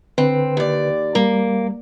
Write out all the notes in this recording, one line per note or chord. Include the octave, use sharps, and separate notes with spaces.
D3 C4 B4
D#2 D5
G3 A#3